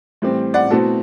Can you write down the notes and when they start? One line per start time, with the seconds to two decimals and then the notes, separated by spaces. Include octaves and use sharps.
0.22 A2 E3 G3 C4
0.54 D5 F#5
0.70 B2 A3 C4 E4 F#4 A4